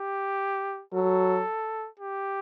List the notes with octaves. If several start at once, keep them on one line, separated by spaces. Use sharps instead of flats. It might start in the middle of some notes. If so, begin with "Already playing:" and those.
Already playing: G4
F#3 A4
G4